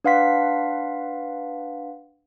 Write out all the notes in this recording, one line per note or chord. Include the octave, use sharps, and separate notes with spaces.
D4 B4 F5 F#5 C6 B6